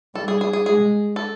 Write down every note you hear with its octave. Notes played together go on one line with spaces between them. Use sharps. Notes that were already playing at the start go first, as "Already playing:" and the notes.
G3 A4
G#4
G#4
G#4
G#3 G#4
A4